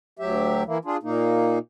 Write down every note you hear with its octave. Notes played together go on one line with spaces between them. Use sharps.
D2 F#3 G4 E5
E3 A#3 E4
D4 F4 G#4
A#2 A#3 D#4